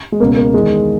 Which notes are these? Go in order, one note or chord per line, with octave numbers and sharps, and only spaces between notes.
G#3
C#2 B2 A#3
A#3
E2 D#3 G#3